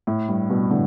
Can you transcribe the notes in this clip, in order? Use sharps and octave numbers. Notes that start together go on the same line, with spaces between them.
A2
G2
G2 B2
A2 D3